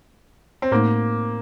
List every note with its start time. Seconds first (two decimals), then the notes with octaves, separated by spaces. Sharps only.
0.62 C4
0.71 A2 A3 A#3 D#4